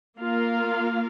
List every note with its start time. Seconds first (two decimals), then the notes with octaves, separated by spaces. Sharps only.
0.18 A#3 F4 A#4 F5